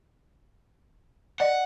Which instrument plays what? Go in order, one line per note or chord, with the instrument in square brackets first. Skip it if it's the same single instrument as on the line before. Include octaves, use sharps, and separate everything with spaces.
[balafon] D5 D#5 [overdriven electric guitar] F#5